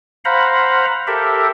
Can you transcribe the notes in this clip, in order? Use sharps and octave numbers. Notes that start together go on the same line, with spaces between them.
C5 F5 F#5 A#5 B5
G4 A4 A#4 E5